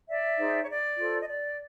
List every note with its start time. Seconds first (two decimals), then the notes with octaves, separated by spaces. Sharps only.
0.09 D5 E5
0.39 D#4 G#4 C5
0.61 C#5
0.69 D5
0.98 F4 A4 C5
1.20 D#5
1.28 D5